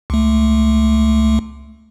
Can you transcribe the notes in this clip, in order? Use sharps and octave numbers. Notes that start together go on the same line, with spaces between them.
C#2 A3